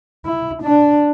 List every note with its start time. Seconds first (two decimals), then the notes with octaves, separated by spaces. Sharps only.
0.25 E4
0.63 D4